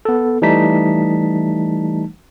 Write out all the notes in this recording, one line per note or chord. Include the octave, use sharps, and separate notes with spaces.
B3 A4
E3 G3 A3 D#4 A5 B6